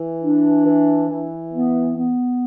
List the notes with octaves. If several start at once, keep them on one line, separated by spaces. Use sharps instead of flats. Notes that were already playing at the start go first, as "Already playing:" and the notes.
Already playing: E3
D4
E3
E3
B3
B3